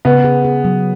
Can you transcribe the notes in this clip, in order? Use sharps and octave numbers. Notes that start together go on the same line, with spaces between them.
C#3 B3
G#4
G#4
F#3